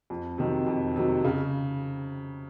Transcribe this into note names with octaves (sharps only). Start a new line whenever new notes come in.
F2
C3 D#3 F#3
F2
C3 D#3 F#3
C#3